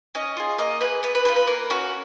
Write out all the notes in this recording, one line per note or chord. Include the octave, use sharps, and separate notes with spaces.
C#4 D#5
F4 G#4
A#3 D#5
F4 G#4 B4
B3 B4
B4
G#4 B4
F4
B4
A#3 A#4
C#4 F#4